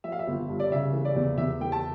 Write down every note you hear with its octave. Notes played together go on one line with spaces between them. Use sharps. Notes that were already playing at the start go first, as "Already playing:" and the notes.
F3 E5
F5
E5
G1
G2
D5
C#3 E5
E3
D5
E2
E2 E5
E3 G5
A5